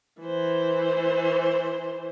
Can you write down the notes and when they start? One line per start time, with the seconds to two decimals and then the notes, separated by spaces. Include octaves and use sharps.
0.22 E3 C5